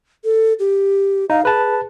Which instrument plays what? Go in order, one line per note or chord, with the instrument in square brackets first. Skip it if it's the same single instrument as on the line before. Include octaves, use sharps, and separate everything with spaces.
[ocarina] A4
G4
[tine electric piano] D#4 [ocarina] F5
[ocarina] G#4 [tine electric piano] B4 A5